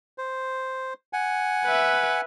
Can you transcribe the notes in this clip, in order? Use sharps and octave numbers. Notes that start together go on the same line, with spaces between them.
C5
F#5 G#5
B4 E5